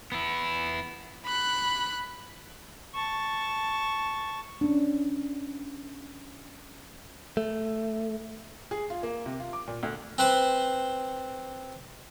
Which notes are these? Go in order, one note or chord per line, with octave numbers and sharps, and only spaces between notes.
B3 E4
B5 F#6
A5 C#6
C#4 D4
A3
G#4
F4
A#3
C3
F4
D6
A#2
D2
C4 B4 C5 C6